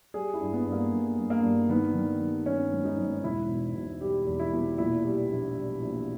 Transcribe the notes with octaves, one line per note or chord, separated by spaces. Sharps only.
G3 G#4
E4
G2
B3
G2
A#3
G2
G2
A#3
G2
D#3 B3
D#3
D#3
G2 C#4
G#1
D#4
G#1
E1 E4
B2
B2
G3 G4
E2
E4
B2
A#2 E4
G3
A#1
G3
A#1